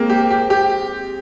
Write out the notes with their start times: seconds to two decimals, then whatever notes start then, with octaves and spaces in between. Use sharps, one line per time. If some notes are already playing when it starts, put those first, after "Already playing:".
Already playing: G#3 A#3 C4
0.10 G4
0.30 G4
0.50 G4